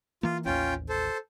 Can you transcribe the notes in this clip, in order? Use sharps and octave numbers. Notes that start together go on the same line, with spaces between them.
E3 A#3 F4
A1 D#2 C#4 F4 G5
A4 C5